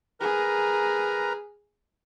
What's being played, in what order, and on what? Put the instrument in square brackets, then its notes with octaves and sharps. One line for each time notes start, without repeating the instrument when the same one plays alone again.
[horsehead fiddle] G#4 [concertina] A#4 B4 A#5